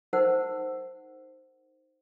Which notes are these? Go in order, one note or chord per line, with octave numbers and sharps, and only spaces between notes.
D#4 A#4 C5 F#5